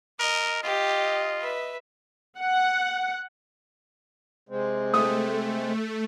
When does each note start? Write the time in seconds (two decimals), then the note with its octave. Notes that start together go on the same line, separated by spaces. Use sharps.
0.19 A#4 D#5
0.63 F4 G4 D#5
1.40 B4 E5
2.38 F#5
4.49 C3 G#3 C4
4.94 A3 D#6